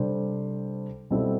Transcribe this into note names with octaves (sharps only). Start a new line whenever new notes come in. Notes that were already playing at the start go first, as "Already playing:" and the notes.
Already playing: C3 G3 D4 A4 C5
B2 G3 C4 E4 A4